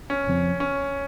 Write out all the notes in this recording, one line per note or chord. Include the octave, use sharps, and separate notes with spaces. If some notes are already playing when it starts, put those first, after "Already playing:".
C#4
F2 C#3 F3 C4
C#4